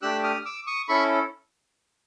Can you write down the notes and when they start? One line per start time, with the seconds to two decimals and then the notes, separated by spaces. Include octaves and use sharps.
0.02 A3 D4 G4 E6 F#6
0.23 D#6 F6
0.45 D6 E6
0.67 C#6 D#6
0.88 C#4 E4 A4 B5 C#6